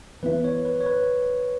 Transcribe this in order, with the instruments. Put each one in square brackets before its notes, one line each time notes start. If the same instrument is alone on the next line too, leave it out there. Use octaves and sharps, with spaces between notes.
[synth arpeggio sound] E3 B3 E4 [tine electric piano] B4
[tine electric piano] C#5
B4
C#5
B4